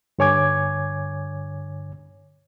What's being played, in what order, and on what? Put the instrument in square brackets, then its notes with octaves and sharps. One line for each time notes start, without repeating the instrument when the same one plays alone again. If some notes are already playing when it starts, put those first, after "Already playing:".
[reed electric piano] G2 D3 C#5 G#5 D6 G#6